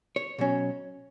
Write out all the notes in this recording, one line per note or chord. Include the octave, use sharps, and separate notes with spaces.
C#5
B2 F#3 C#4